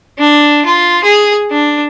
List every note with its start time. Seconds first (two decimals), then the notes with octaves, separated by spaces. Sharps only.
0.19 D4
0.66 F4
1.04 G#4
1.51 D4